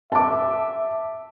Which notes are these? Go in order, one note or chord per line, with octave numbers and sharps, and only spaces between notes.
E5 A5 D6